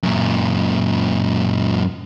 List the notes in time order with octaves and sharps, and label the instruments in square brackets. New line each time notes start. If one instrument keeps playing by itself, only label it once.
[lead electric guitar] F#2 A#2